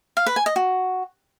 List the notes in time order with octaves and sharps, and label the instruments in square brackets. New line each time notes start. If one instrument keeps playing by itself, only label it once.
[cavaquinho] F5
B4
G#5
D#5
F#4